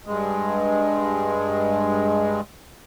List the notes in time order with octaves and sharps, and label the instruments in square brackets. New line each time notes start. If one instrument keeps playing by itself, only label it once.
[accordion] G2 G#3